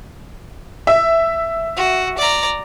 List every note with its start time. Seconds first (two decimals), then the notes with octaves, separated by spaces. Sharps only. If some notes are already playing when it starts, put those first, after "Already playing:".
0.87 E5
1.77 F#4
2.18 D5 A#5